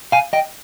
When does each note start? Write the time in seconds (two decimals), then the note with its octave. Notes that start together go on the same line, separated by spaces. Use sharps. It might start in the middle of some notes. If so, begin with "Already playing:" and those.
0.12 F5 G#5
0.33 D#5 G5